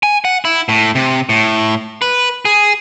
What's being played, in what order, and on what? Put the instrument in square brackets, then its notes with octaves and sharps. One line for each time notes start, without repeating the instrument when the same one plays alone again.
[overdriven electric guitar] G#5
F#5
E4
A2
C3
A2
B4
G#4